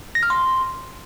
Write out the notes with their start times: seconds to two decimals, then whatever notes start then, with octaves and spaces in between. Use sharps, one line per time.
0.15 A#6
0.23 F6
0.30 C6